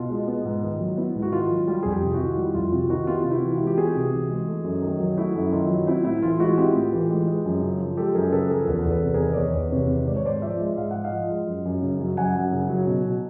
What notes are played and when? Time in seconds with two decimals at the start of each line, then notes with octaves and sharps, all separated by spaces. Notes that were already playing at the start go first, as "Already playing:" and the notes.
Already playing: B2 F4
0.10 G#3
0.28 B3
0.45 G#2
0.63 D#3
0.80 F#3
0.97 B3 E4
1.15 G#2
1.22 F#4
1.32 D#3 F4
1.50 F#3
1.67 G3 F4 G4
1.83 F2 G#4
1.91 F4 G4
2.02 C3
2.14 E4 F#4
2.21 D#3
2.30 F4
2.37 G3 E4
2.55 F2 F4
2.72 C3 E4 F#4
2.90 D#3 E4 F#4
3.07 B3 F4 G4
3.24 C3 F4
3.31 E4 F#4
3.42 E3
3.54 F4 G4
3.60 G#3
3.67 G4
3.77 B3 F#4 G#4
3.95 C3
4.13 E3
4.30 G#3
4.48 A3
4.64 F#2
4.82 D#3
5.00 F#3
5.17 A3 E4 F#4
5.35 F#2
5.52 D#3 F4
5.70 F#3
5.87 C4 E4
6.05 A2 E4
6.22 E3 F4
6.40 G#3 E4 F#4
6.57 C4 F4 G4
6.75 A2
6.92 E3
7.10 G#3
7.27 G#3
7.45 F#2
7.62 C#3
7.80 F3
7.97 G#3 G4 A4
8.15 F#2 G#4 A#4
8.32 C#3 A4 B4
8.50 F3 G#4 A#4
8.67 E2 A4 B4
8.85 E2
8.91 A4 B4
9.02 C3
9.14 G#4 A#4
9.20 D#3
9.33 D5
9.37 E2 B4 C#5
9.54 E2
9.72 C3 B4 C#5
9.90 D#3
10.07 G#2 D5
10.16 C#5
10.25 G#2 C5 D5
10.42 F3 D5 E5
10.60 G#3
10.77 G#2 F5
10.91 G#2 F#5
11.04 D#5 F5
11.12 F3
11.30 G#3
11.47 F#2
11.65 F#2
11.82 C#3
12.00 F#3
12.17 F#2 F#5 G#5
12.35 F#2
12.52 C#3
12.70 F#3
12.87 B2
13.05 B2